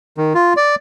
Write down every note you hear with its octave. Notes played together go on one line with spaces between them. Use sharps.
D#3
F4
D5